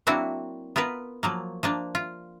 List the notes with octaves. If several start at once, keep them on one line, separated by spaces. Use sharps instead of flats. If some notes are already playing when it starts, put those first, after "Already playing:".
F#3 A#3 C4 D4 E4 F#4
B3 F4 A#4 B4
F3 F#3 A#3
F3 A#3 D4
F4